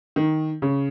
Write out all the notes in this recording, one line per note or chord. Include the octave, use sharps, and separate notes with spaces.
D#3
C#3